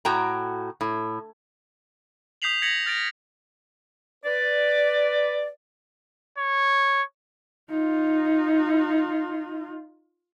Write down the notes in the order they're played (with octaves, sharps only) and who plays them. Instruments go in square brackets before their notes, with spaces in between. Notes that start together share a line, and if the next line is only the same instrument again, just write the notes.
[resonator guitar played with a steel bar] A2 F#4 G5 A#5
A2
[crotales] D#6 G6 B6 C7 F7 F#7
G#6 A#6 B6 C#7 F7 F#7
F6 A6 A#6 D7
[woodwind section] B4 D5
[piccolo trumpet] C#5
[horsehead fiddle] D#4 F4